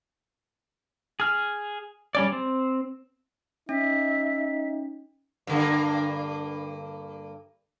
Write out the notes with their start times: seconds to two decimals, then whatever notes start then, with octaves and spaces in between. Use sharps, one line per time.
1.20 G#4 F6
2.15 G3 C#4 D5
2.32 C4
3.69 C#4 D#4 E5
5.47 G2 D3 A#3